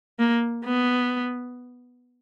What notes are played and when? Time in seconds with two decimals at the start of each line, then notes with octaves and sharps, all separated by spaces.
0.19 A#3
0.65 B3